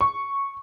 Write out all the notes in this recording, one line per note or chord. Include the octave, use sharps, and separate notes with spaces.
C#6